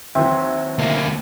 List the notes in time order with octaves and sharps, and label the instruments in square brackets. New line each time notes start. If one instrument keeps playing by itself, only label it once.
[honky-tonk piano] D#2 E3 F#3 [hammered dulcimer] C4 [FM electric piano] E5
[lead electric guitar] D2 A#3